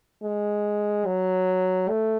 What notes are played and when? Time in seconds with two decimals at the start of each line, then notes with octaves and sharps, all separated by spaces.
0.23 G#3
1.06 F#3
1.89 A3